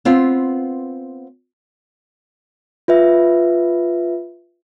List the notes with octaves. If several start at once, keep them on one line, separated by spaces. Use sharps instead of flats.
B3 C4 F4
F4 B4 E5